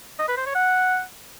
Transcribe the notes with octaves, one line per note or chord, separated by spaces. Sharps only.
D#5
B4
C5
C#5
F#5